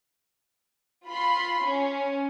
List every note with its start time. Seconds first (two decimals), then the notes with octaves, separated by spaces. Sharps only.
1.09 F4 B5 C6
1.65 C#4